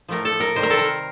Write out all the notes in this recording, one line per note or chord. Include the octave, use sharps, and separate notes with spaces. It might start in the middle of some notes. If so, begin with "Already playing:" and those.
A2 F3 A3 A#4
A4
A#4
C3 D#3 G3 C5
A#4
A4
A#4